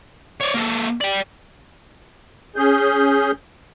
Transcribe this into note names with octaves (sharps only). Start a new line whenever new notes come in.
C#5 D5
A#3 A4
D5 G5
C#4 G#4 G6